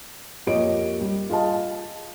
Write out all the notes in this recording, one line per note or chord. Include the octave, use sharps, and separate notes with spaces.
F2 A#3 G4 C#5 D#5 D7
G3
F4 G#4 D#5 F5 A5